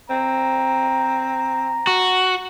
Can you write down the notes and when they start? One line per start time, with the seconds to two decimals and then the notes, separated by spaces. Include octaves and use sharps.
0.10 C4 A#5
1.87 F#4